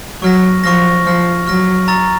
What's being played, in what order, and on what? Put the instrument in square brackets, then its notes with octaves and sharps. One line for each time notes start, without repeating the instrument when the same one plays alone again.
[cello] F#3 [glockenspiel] C#6 F6 A#6
[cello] F3 [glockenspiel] C#6 F6 A#6
[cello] F3 [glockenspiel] C#6 F6 A#6
[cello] F#3 [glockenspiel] C#6 F6 A#6
[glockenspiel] A#5 C#6 E6 A6